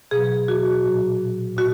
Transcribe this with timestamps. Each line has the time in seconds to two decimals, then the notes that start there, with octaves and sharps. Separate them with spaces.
0.11 B2 F#3 G#4
0.48 F#4
0.84 A#2 F#3
1.57 A#2 F#4